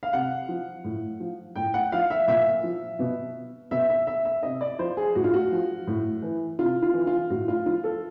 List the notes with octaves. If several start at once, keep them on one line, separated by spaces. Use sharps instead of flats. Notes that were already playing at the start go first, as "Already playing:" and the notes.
F5
C3 F#5
F3
A2
F3
A2 G5
F#5
F3 F5
E5
A#2 E5
F3
B2
B2 E5
E5
E5
E5
C3 D#5
D5
F3 C5
G#4
A2 F#4
F4
F#4
F3
A2
E3
C3 F4
F4
E3
F4
A2 F#4
F4
F3 F4
A4